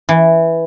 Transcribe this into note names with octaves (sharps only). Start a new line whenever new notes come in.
E3